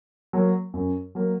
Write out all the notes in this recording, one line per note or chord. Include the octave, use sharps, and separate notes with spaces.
F#3 A#3
F#2
F#3 A#3